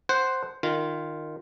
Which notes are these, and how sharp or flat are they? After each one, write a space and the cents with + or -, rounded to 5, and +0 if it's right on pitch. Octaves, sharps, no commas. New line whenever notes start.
C5 +0 F#5 +15
D#3 -15 F4 +0